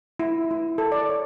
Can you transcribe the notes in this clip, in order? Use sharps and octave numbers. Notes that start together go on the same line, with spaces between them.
E4
E4
A4
D5
C#5